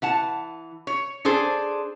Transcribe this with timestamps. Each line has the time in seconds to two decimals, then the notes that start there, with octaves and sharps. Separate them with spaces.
0.02 E3 F#5 A5
0.87 C#5
1.25 D4 G#4 A4 C5